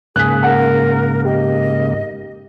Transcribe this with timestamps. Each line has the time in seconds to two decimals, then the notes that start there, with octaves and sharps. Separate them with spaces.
0.16 G#2 C#3 A#3 G#4 F#6 B6
0.43 A#4 F#5
1.25 G4 D#5